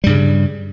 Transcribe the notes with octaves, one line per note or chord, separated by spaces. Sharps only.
G2 C#3 G3